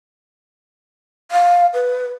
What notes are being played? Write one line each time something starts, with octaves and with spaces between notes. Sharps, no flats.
F5
B4